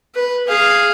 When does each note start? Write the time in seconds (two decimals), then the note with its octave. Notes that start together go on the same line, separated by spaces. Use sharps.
0.15 B4
0.47 G#4 F5